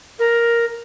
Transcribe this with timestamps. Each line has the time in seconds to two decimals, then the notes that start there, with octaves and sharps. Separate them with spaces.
0.18 A#4